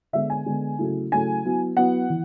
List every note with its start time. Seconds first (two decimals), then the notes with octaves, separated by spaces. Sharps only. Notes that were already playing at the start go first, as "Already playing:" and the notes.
0.13 D3 G#3 B3 E5
0.30 G#5
0.46 D3 G#3 B3
0.79 C#3 F#3 A3 E4
1.12 C#3 F#3 A3 E4 G#5
1.45 F#3 B3 E4
1.77 F#3 B3 E4 F#5
2.10 E3